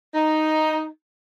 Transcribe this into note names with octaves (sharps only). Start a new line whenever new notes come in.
D#4